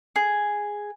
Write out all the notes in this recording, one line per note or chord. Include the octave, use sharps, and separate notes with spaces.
G#4